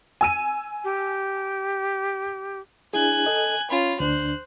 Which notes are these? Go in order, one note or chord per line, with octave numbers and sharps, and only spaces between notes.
G#5 E6 D#7
G4
D4 E4 G#4 G#5 F#6
A4 D#5
C#4 F4 B5
D2 D4 C5 F#6